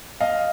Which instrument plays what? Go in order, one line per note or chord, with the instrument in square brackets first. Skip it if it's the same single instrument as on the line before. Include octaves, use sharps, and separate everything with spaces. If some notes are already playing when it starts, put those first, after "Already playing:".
[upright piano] D#5 F5